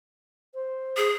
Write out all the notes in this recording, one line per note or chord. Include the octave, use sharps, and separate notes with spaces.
C5
G#4